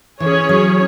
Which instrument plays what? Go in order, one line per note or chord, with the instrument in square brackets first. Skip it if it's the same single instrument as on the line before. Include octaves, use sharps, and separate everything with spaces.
[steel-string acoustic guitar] E3 [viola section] C#4 G#4 C#5
[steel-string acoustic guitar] F#3